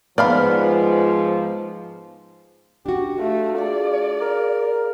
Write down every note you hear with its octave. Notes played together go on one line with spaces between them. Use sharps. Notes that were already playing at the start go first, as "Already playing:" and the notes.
G#2 F3 B3 D5 F5 B5
D4 F#4 G4
A3 F4
G#4 D5 F5
A#4